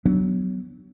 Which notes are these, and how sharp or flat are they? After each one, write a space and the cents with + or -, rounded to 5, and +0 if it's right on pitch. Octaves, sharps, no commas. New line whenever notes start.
F#3 +15 B3 +15 D4 +0